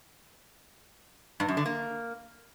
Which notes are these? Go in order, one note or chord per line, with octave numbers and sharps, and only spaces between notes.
G2
F#2
D3
A#3